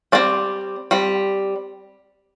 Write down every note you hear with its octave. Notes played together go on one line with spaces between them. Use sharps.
G3 C4 D5
G3 C4